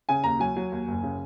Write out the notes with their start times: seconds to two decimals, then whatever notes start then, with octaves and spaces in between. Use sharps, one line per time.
0.09 C#3 G#5
0.24 D#2 A#5
0.40 F#3 G#5
0.56 F#3
0.72 D#2
0.88 F#1
1.03 C#3